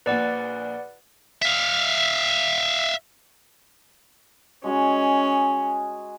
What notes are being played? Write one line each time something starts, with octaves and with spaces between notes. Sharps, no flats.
A#1 A#2 B4 D5 F#5
E5 F5
G#3 C#4 F#4 G#4